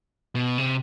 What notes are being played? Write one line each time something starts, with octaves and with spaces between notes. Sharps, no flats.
B2
C3